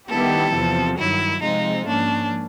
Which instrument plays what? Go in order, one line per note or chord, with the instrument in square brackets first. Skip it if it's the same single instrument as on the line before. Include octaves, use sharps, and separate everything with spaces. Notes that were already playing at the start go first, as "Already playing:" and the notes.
[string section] D#3 G3 B3 E4 G4 [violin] A4
[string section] E2 C3 F3
[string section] G2 D#3 F#3 [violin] E4
[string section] C3 F3 G#3 C4 F4 [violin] D#4
[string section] G#2 F3 A#3 C#4 [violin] D4